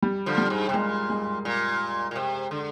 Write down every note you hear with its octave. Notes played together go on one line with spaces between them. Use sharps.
G3
D3 F3
G3
G#2
C3
A#2 G#3
G#3
A#2
A#2
C3
D3